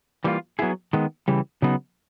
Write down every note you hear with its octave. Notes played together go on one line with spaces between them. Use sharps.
E3 G3 A#3 D4 F4
F#3 B3 E4 G#4
D#3 G#3 B3
C#3 E3 G3
C#3 F#3 B3 D#4